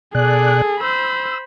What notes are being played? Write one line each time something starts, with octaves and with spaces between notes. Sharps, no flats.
B2 G#4 A4 D5 F#6
C5 B5 E6